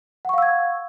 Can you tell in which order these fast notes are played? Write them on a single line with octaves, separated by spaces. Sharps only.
F#5 C#6 F5 E6 G#6